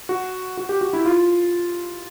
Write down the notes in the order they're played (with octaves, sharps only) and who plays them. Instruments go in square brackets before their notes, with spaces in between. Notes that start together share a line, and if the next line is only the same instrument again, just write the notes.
[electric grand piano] F#4
F#4
G4
F#4
E4
F4